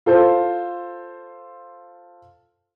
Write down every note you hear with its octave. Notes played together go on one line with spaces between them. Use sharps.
F4 A4 C5